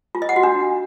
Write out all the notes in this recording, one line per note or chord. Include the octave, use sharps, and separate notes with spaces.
F4
D#5
F#5
F#4
D4